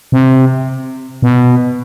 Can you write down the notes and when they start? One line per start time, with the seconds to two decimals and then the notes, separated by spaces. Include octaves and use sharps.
0.12 C3
1.22 B2